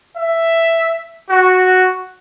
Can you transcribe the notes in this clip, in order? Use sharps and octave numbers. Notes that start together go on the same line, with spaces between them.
E5
F#4